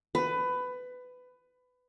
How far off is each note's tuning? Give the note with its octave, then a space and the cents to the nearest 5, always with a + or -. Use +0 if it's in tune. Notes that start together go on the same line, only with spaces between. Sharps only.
B4 +20